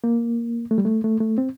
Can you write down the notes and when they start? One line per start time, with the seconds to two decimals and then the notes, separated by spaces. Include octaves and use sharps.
0.04 A#3
0.71 A3
0.78 G3
0.85 A3
1.04 A3
1.20 A3
1.38 C4